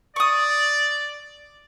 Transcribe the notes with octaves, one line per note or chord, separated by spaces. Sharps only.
D5 C#6 D#6